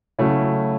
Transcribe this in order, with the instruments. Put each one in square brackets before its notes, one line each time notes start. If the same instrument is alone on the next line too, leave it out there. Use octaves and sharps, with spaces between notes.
[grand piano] C#3 F#3 A3 C#4 E4